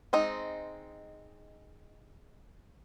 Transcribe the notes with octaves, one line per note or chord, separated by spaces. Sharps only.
G#3 C4 D#4